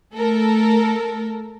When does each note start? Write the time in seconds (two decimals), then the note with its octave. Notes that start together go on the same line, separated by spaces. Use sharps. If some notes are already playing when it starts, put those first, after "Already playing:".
0.13 A3 A4 A#4